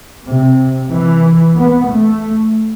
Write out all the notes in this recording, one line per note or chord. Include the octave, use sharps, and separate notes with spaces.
C3
E3
B3
A3